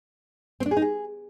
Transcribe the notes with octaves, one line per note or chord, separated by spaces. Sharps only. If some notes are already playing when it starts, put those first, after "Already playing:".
C4
D4
G#4
D#4
G#4